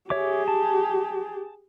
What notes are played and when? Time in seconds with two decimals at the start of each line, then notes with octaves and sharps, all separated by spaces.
0.10 G4 G#4 C#5 E5 D6
0.48 A5